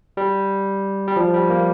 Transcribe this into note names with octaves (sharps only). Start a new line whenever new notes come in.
G3
G3
F3
G3
A#3